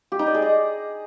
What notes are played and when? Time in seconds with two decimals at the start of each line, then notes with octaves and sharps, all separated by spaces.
0.12 G4
0.19 D#4
0.27 D5
0.34 G#4
0.42 D#5